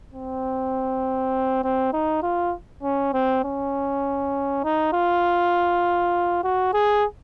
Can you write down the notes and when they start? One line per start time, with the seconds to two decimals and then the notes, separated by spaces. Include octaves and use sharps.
0.13 C4
1.64 C4
1.93 D#4
2.23 F4
2.83 C#4
3.14 C4
3.44 C#4
4.64 D#4
4.93 F4
6.44 F#4
6.73 G#4